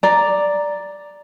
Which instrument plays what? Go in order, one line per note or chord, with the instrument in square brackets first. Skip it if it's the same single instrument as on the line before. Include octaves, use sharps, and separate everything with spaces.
[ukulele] D5 A#5